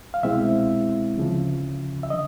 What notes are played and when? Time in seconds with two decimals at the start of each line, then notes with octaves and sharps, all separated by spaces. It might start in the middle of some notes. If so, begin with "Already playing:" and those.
0.14 F5
0.23 C2 B2 G#3 C4 E4 E5
1.17 D2 C#3 F3
2.03 E5
2.10 D3 D#5